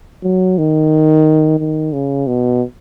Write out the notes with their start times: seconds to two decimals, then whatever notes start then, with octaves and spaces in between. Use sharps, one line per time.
0.23 F#3
0.58 D#3
1.59 D#3
1.93 C#3
2.27 B2